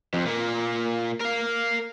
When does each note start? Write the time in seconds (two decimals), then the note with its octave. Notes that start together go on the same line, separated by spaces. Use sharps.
0.14 F2
0.26 A#2 A#3
1.21 A#4 F5